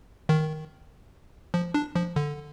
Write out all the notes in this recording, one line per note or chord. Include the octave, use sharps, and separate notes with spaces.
D#3
F3
D4
F3
D3